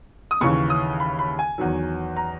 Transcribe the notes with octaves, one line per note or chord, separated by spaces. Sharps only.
D#6
D#2 C#3 E3 C#6
D#6
B5
B5
G#5
E2 D#3 F#3
A#5